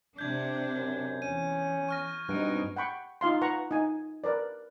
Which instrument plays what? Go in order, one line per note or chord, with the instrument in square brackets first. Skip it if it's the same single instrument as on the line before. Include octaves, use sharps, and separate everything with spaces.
[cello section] C3 D4 [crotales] G6 G#6
[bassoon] F#2
[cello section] E2 [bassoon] C#4 [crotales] D#7
[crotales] C#6 F6 A#6
[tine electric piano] G2 [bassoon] B2 [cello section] C4 D#4 [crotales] F#6 D7
[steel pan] F#5 G5 B5 C#6
D#4 F4 F5 C6
B4 F#5 A#5 C#6
D#4 G#5
A#4 B4 D5